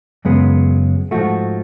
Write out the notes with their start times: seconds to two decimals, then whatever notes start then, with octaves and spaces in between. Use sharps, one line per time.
0.25 F#2 C#3 G#3 B3
1.11 G#2 F3 A3 F#4